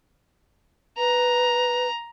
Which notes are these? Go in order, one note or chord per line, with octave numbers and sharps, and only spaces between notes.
B4 A#5